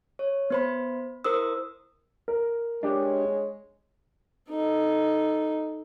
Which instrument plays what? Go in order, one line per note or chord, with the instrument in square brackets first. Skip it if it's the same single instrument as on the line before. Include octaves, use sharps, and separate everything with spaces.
[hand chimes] C#5
B3 C5 B5
E4 A#4 C5 D#6 E6
[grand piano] A#4
[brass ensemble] G#3 G#4 C#5 [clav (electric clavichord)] D4 G4
[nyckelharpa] D#4 A4